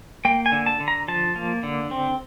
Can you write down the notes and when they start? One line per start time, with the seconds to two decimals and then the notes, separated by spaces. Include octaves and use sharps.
0.25 A#3 G5
0.46 G#5
0.52 D3
0.66 A5
0.80 D3
0.88 A#5
1.08 F3 A5
1.36 A#3
1.63 D3
1.91 C4